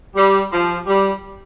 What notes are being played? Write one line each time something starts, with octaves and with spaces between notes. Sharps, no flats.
G3
F3
G3